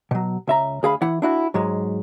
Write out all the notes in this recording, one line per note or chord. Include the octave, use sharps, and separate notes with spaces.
B2 F#3
C#2 E5 A#5
D2 G#4 F5 B5
E3 E4 F#5
D4 E4 F#4
G#2 F#3 G#3